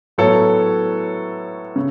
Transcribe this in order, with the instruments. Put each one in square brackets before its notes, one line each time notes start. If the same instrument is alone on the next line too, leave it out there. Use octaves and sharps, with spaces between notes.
[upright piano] A2 F#3 B3 A4 C#5
C#3